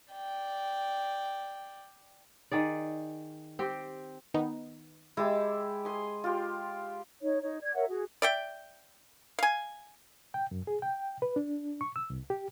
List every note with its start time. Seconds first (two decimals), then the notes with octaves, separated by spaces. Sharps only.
0.13 D5 G5
2.52 D#3 G#4 D5
3.59 C4 G4
4.34 D#3 B3 D#4
5.17 G#3 E4 G4 A5
5.85 G#4 C6 D#6
6.24 F4 G4
7.22 D#4 C#5
7.42 D#4 C#5
7.61 D5 G#6
7.74 A#4 C#5 E5 F#5
7.88 F#4 G#4
8.22 D5 E5 G5
9.39 F5 G#5
10.34 G5
10.51 F#2
10.67 G#4
10.82 G5
11.22 B4
11.36 D4
11.81 C#6
11.96 E6
12.10 C2
12.30 G4